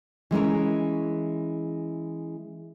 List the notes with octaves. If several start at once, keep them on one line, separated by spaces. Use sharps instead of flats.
E3 G#3 C#4 A#4